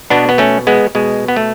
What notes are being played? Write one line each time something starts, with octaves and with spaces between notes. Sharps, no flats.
B2 B3 D4
B3
A3 C#4
G#3 B3
B2 G#3
B3
A3